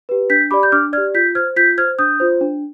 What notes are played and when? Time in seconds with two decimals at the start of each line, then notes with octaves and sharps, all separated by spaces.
0.09 G4 B4
0.30 D4 G6 B6
0.51 G4 D5 B5 D6
0.63 G6
0.72 D4 D6 F6
0.93 D5 F6 G#6
0.97 G4
1.14 F4 G6 B6
1.35 C5 F6 G#6
1.56 F4 G6 B6
1.77 C5 F6 G#6
1.98 D4 D#6 G6
2.20 F4 C5
2.41 D4